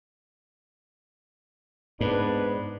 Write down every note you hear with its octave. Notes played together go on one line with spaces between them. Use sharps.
G#2 B3 D4 B4